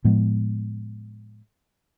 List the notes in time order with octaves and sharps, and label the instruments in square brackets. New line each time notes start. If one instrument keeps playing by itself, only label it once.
[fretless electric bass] A2 F3 G#3 B3